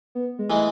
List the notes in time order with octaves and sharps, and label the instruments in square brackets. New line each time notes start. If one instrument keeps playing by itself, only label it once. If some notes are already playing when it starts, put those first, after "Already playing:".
[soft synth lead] B3
G#3
[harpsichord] E3 G#3 [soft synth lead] A3